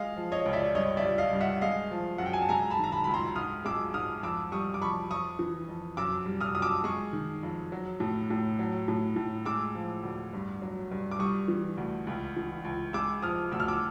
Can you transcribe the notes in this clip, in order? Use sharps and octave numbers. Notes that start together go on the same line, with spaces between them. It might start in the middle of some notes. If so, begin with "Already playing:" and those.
Already playing: G#3 D#5 F5
F3
C#5 D#5
C#2
D5 E5
G2 C#5 D#5
D5 E5
G3
D#5 F5
G2
E5 F#5
G#3 D#5 F5
F3
F#2 F#5
G5
G#5
A5
G#3 G#5 A#5
A5 B5
D#3
A#5
A5 B5
C#2 B5
A#5 C6
G#2 D#6 F6
G#3 D6 E6
G#2 D#6 F6
F2 D6 E6
G3 C#6 D#6
D6
F2 B5 C#6
F2 C#6 D#6
E3
F2
F#2 D6 E6
G3
D#6 F6
F#2 D#6
D6 E6
G#3 C#6 D#6
D#3
F2
F#3
A2
A2
F#3
A2
A2
G#3 D6 E6
F3
D2
G2
F#3
G2
D6
G3 C#6 D#6
E3
D2
C#2
E3
C#2
G#3 D6 E6
F3 D#6 F6
D2 E6
F6
D6 E6